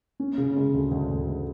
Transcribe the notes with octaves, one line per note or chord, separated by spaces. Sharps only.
C#4
C#3
G#3
D2
D2
D2
G#3